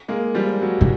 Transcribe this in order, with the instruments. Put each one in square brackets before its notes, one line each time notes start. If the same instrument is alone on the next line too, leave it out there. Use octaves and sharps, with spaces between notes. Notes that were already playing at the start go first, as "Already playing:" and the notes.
[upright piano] G#3 A#3
F3 G3
F#3
[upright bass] A2